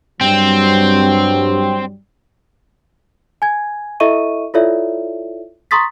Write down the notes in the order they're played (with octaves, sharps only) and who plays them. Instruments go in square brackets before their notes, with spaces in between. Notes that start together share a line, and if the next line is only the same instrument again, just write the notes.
[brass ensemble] G2 F#3 G3 [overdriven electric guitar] C4
[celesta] G#5 G#6
E4 A4 D#5 E5 C#6 D#7
E4 F4 A4 C#5 D5 E5
A#5 C6 C#6 D#6 A6 B6